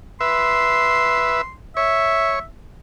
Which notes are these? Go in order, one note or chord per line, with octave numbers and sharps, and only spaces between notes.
B4 E5 C6
C#5 E5